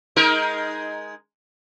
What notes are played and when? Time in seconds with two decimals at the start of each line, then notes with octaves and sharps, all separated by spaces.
0.16 G#3 D#4 A#4